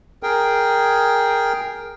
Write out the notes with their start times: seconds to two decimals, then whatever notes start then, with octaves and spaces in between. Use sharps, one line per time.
0.23 G#4 A#4 G5